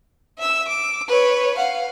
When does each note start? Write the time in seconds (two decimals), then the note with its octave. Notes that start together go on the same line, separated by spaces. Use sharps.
0.38 E5 E6
0.68 D6
1.08 B4 C#5
1.57 F5 F#5